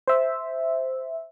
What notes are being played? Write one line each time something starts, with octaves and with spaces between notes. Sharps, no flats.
C5 E5